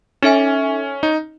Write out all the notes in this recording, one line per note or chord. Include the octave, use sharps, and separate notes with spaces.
C#4 D#4 A4 E5 G#5
D#4